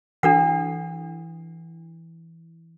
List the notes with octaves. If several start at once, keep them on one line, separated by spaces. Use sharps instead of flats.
E3 D4 A4 F#5